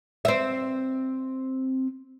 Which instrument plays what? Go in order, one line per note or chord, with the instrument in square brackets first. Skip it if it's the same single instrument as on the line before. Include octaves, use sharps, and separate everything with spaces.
[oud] C4 E5